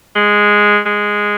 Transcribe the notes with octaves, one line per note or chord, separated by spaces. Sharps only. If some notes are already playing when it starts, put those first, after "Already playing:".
G#3
G#3